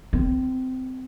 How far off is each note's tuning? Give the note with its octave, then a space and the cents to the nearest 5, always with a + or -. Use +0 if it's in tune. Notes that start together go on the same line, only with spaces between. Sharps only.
C4 -25